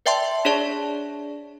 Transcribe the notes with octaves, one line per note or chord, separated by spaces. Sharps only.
B4 D5 E5 G5 A5 C6
D4 G#4 C#5 D5 A5